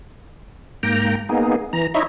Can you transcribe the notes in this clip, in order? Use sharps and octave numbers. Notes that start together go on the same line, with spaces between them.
G#2 A#3 G5 A#5
A#3 B3 D#4 G#4
E3 A#5
D#4 E4 C#5 D#5 E5